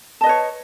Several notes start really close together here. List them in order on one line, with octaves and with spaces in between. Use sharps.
A5 D#5 B4 C#5